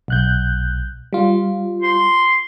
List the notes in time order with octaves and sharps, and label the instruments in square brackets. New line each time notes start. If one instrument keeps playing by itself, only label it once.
[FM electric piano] B1 F#6 G6
G3 F4
[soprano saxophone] C6